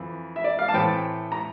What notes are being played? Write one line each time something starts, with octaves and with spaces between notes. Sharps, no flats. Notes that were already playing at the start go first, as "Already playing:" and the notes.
Already playing: F2 E3
E5
D5
F5
A5
A2 E3 A3 C4 G5
A#5